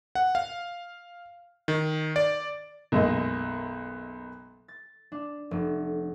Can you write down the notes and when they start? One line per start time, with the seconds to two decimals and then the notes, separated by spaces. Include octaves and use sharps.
0.15 F#5
0.35 F5
1.68 D#3
2.16 D5
2.92 B1 F#2 G#3 A#3 D#5
4.68 A6
5.12 D4
5.51 F1